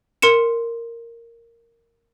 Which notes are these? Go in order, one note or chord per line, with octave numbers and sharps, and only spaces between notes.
A#4 C6 C#7 E7